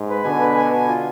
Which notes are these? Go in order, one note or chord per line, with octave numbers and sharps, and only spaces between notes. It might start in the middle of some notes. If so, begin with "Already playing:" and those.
Already playing: G#2
B4
B2 D3 G#5
B4
G#5
G#5
F4